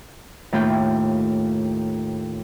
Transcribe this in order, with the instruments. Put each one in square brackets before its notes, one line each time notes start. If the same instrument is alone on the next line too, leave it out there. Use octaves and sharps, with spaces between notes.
[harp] D#2 A2 F4 G5